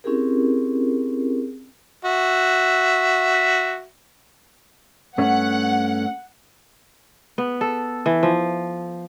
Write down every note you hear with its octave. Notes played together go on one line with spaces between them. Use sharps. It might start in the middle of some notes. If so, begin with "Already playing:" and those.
C4 C#4 E4 G4 G#4 A#4
F#4 E5
G2 A3 C#4 F#5
B3
A4
E3
F3